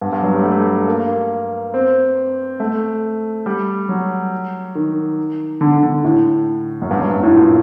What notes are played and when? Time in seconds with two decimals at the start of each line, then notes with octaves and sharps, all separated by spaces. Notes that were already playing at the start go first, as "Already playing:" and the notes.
0.01 G2
0.13 G2
0.23 F#3
0.34 G3
0.43 A3
0.52 G3
0.88 A#3
1.74 C4
2.60 A3
3.46 G3
3.89 F#3
4.75 D#3
5.61 D3
5.83 D3
6.04 A2
6.82 F#2
6.91 G2
7.01 F#2
7.11 G2
7.23 A2
7.34 A#2